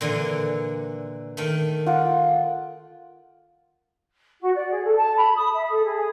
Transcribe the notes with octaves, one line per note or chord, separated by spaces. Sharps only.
A#2 D3 E3
D#3 A3
F4 F#5 D6
F#4
D5
G#4
A4
A5
B5
D#6
E5
A4
G#4
G#4